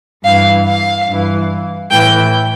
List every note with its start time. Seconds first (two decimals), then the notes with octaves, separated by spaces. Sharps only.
0.24 G2 E3 F5
0.66 F5
1.08 G2 E3
1.90 A2 E3 G5